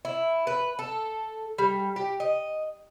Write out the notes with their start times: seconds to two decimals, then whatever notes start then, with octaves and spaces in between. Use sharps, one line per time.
0.05 E4
0.47 B4
0.79 A4
1.58 G3
1.96 G4
2.20 D#5